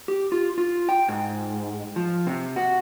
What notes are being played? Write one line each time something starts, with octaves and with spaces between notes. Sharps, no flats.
G4
F4
F4
G5
G#2
F3
C3
F#4